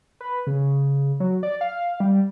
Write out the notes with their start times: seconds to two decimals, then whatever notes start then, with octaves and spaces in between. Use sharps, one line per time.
0.21 B4
0.47 C#3
1.20 F#3
1.43 D5
1.61 F5
2.00 G3